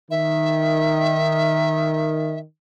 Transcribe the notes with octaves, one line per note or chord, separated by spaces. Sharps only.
D#3 E5